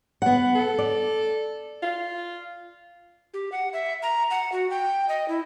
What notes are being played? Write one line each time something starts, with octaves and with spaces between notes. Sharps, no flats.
B3 F#5
A4
D5
F4
G4
F#5
E5
A#5
F#5
F#4
G5
D#5
E4